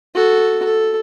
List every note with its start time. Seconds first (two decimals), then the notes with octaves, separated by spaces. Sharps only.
0.15 F#4 A4
0.64 A4